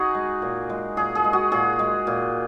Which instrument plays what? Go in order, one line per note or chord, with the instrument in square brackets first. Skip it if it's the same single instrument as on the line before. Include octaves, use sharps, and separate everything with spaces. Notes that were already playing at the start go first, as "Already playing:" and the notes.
Already playing: [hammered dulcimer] D#4 F#4 G#4
G#3
A#2
G#3
A#2 G#4
G#4
G#3
F#4
A#2 G#4
G#3
A#2